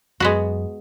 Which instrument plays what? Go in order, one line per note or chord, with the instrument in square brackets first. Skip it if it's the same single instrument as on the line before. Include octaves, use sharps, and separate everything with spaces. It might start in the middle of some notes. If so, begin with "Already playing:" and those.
[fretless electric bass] F#2 [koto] G#3 B3 F#4